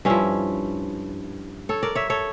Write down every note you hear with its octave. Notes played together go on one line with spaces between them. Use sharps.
G2 F3 C#4 E4
A4 C#5
A#4 D5
C#5 E5
A4 C#5